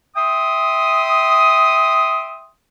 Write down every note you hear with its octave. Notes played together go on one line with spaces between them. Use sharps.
E5 G5 C6 D#6